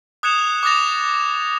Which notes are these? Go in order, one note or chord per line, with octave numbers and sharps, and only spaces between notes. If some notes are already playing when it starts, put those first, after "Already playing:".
D#6 F#6 G#6 C#7 E7 F7
D6 D#6 F#6 A6 A#6 F7